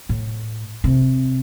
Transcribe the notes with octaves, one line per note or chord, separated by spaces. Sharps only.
A2
C3